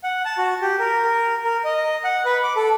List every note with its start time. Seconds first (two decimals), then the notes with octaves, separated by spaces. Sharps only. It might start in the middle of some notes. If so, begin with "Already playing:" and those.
0.04 F#5
0.25 A5
0.38 F#4
0.62 G4
0.79 A#4
1.05 A#4
1.44 A#4
1.64 D#5
2.04 F#5
2.25 B4
2.43 D6
2.56 A4